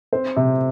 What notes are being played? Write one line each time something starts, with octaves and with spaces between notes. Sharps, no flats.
C4 C5
C3